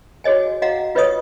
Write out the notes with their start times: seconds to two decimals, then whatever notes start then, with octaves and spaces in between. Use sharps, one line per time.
0.24 F#4 G#4 C#5 D#5 G#5
0.62 F#4 D#5 F5 F#5 A#5
0.95 F4 B4 C#5 D#5 C#6 D#6